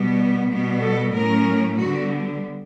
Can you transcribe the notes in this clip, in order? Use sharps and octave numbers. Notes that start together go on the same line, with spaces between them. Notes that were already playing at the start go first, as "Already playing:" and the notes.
Already playing: B2 G3 B3
B2 G3 B3
A4
A2 F#3 A3 C#4 A#4
D3 G3 B3 F#4